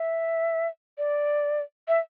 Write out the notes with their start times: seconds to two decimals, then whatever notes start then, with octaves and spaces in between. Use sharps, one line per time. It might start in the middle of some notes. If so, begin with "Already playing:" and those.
Already playing: E5
0.98 D5
1.88 E5